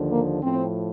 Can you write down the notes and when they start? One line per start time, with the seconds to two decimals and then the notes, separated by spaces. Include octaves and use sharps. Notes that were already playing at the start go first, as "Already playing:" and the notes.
Already playing: D#2 D3 F3
0.11 A#3
0.43 A2 F3 C4